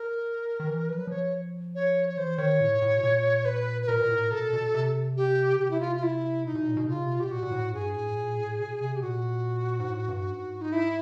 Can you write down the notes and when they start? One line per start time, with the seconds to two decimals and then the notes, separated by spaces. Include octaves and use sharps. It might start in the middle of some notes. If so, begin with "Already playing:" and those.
Already playing: A#4
0.60 D#3
0.67 E3
0.88 F3 B4
0.98 F#3
1.07 F3 C#5
1.75 C#5
2.09 C#5
2.17 E3 C5
2.38 D#3 C#5
2.60 A2
2.82 A2
2.97 B2
3.03 A#2
3.45 B4
3.82 B4
3.88 A#2 A#4
4.01 A#2
4.10 A2
4.31 B2 A4
4.53 B2
4.74 C3
5.17 G4
5.54 C#3
5.59 C3 G4
5.70 E4
5.80 F4
5.96 F4
6.03 E4
6.45 B2 D#4
6.55 B2
6.67 A#2
6.77 B2
6.88 C#3 F4
7.02 C3
7.16 B2 G4
7.30 A#2 F#4
7.43 A#2
7.52 A2
7.73 G2 G#4
7.95 A2
8.16 A#2
8.37 A2
8.59 B2
8.81 C3
8.96 G4
9.01 A#2 F#4
9.80 G#2
9.87 A2
10.08 G2
10.30 G#2
10.61 D#4
10.72 E4